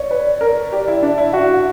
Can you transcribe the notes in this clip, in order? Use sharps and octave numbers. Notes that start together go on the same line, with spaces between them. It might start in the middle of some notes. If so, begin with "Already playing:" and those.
Already playing: C#5 D5
B4
A#4
G4
E4
D4
E4
F#4 E5 F#5
F#5